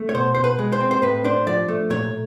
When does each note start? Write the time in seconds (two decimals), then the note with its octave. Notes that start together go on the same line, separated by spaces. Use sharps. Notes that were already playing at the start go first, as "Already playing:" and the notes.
Already playing: A3
0.09 C#5
0.14 B2 C5
0.35 B2 C5
0.44 B4
0.59 G#3
0.72 C5
0.80 C4
0.91 C5
1.02 A2 B4
1.24 D4 C5
1.47 F3 D5
1.68 A3
1.90 A#2 C#5